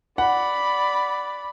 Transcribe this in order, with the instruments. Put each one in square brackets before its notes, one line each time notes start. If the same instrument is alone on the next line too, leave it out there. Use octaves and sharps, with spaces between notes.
[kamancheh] D5 B5 [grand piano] F#5